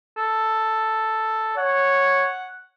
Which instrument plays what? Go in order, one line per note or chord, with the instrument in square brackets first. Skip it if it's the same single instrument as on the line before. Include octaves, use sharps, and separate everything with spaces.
[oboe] A4
[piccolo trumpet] C#5 [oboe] F#5